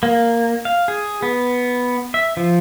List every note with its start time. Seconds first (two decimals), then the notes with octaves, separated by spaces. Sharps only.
0.03 A#3
0.65 F5
0.88 G#4
1.23 B3
2.14 E5
2.37 F3